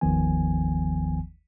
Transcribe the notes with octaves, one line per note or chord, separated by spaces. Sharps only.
G1 D#2 D#3 F3 B3 G#5